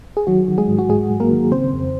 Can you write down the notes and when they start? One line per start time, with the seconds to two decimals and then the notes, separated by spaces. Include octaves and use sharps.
0.17 G#4
0.27 D#3 F#3 F#4
0.48 D#3
0.58 G#3 G#4
0.68 G#2
0.79 F#4
0.89 G#2 G#3 G#4
1.10 G#2
1.20 A#3 A#4
1.31 D#3
1.52 C#3 C4 C5
1.73 F2